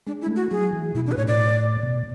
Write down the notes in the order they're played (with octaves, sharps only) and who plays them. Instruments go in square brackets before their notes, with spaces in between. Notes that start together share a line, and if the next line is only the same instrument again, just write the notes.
[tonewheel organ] G#3 [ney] D4
[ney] E4
[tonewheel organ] A3
[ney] F#4
[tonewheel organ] F#3 [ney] G#4
[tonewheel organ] E3
[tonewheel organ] B2 [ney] E4
[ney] D4
B4
[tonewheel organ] A2 [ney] C#5
[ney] D5
[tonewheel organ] B2